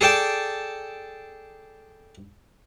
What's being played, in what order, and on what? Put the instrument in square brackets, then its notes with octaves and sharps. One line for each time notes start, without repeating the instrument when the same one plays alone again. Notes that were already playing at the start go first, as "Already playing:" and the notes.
[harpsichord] G#4 A4 D5 G5 A5